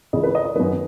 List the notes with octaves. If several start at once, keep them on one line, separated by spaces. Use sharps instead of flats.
C#2 C#3 E3 D#5
B4
D#5
D#5
F#2 D#3 F#3 B4